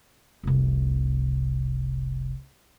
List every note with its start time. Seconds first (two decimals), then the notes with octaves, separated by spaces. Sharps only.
0.43 F1 C2